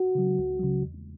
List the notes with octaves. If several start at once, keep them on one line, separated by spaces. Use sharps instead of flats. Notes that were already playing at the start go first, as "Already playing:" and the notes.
Already playing: F#4
C#3 F#3
C#2
C#3 F#3
E2